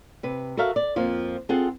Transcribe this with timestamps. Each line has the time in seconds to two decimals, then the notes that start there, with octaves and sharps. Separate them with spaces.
0.23 C3 B4
0.57 F#4 A4 A#4 E5 F5
0.76 D5
0.96 F2 F3 A#3 F4
1.49 C4 F4 G#4 A4 F#5